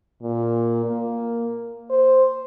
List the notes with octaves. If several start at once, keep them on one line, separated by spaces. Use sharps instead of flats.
A#2
A#3
C5